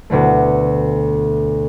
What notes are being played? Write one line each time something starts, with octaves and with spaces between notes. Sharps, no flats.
D2 B2 D3 A3